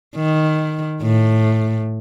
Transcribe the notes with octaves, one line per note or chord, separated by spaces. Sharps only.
D#3
A2